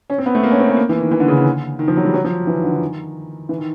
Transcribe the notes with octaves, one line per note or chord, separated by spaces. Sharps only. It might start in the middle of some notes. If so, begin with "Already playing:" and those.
C#4
C4
B3
A3
A#3
C#4
C4
B3
A#3
E3
D#3
E3
D3
C#3
D3
D#3
F3
F#3
G3
F#3
F3
E3
D#3
D3
D#3
E3
D#3